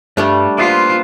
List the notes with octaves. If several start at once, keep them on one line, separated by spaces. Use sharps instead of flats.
G2 G3 A3 D4
A#3 B3 F4 C5